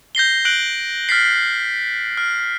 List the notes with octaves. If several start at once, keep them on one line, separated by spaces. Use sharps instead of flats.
G6 A#6 C7 G7
F#6 D7 F#7
F6 A6 B6 C7
F6